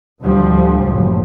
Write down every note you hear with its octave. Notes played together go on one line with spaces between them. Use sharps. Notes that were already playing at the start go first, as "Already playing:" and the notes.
D2 A2 F3 G3
F#1 A2